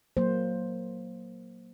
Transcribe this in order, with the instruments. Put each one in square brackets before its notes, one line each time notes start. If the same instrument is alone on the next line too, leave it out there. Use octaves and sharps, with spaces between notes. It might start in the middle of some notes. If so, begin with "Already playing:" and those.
[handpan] F#3 A#3 C5